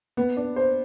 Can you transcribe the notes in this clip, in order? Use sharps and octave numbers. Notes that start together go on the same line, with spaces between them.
B3
D4
C5